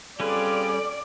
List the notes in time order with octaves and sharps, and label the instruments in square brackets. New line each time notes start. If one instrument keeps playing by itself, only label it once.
[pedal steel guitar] G3 C#4 B4 [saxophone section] C4 F4 G#4 [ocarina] A4 [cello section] D5